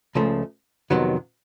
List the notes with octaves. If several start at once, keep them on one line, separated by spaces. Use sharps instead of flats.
C#2 C#3 F3 A3
F2 C3 D#3 F#3 B3